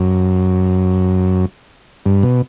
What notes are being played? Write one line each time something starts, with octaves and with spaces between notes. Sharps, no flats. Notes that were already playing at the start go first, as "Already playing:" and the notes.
Already playing: F#2
G2
B2